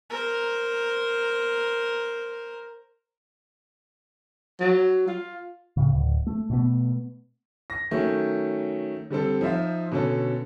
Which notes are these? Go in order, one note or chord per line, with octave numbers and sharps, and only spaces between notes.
A#4 C5
F#3
F4
A2 C#3
D1
A3
B2 A3 B3
A#6
D#3 F#3 A3 C#4
D3 G3 C4 A4
F3 D#4 C5 E5 F5
B2 D3 C#4 A4